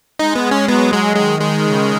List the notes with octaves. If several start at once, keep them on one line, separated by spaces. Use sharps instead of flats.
G#3 D#4
B3
C#4
F#3 B3
G#3
D#3 G#3
G#3
C#3